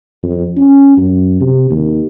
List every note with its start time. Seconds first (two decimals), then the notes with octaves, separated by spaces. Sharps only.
0.23 F2
0.57 C#4
0.97 F#2
1.41 C3
1.71 D#2